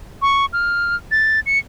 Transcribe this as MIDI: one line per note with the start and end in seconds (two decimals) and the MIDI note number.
0.22 0.46 85
0.53 0.96 89
1.11 1.40 93
1.46 1.58 97